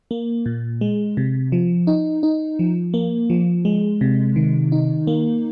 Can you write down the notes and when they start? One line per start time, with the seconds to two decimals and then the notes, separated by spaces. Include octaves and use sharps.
0.11 A#3
0.46 A#2
0.81 G#3
1.17 C3
1.52 F3
1.87 D#4
2.23 D#4
2.59 F3
2.94 A#3
3.30 F3
3.65 G#3
4.01 C3
4.36 D#3
4.72 D#4
5.07 A#3